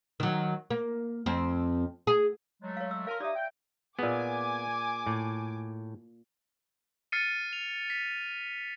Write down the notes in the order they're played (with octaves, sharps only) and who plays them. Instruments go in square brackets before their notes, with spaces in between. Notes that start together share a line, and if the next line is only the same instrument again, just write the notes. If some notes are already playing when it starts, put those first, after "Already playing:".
[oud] D#3 F#3
A#3
F2 C4
G#4
[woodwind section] F#3 G#3 A3
[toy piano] C#5 F5
E6
[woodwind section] A#4 [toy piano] F5 A5 C6
[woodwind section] D#4 G4 D#6 [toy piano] D5 E5
[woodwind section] G5
[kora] A#2 G#4 [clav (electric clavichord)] B3 [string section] G#5 D6
[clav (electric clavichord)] A2
[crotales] F6 A6 C7 C#7 D#7
F7
B6